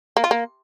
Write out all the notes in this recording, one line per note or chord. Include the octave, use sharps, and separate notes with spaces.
A#3
F4
A#3